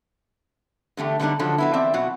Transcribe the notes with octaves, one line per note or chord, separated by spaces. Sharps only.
E2 D3 A3 G4
D3 G3 G#3 B3 D4 D#4
D3 F3 F#3 A4
F#3 B3 E4
E2 C4 D5 E5
B2 F#3 F#4